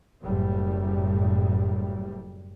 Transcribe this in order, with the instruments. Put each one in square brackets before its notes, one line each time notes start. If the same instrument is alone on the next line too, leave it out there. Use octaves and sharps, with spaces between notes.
[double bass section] F#1 F#2 A2 G3